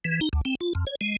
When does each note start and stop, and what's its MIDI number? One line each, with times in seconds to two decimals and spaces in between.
0.05 0.20 52
0.21 0.29 63
0.33 0.41 38
0.45 0.55 60
0.61 0.73 65
0.75 0.85 41
0.87 0.95 73
1.01 1.17 56